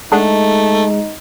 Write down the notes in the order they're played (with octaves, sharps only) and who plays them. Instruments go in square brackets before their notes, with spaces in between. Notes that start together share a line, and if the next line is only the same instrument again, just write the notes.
[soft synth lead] G#3 [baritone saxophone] A3 [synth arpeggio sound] D4 G#4 F#5 [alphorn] D#4